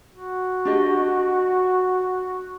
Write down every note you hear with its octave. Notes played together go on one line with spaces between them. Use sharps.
F#4
D4 G4 D#5